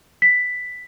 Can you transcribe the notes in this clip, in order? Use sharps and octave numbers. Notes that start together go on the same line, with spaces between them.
B6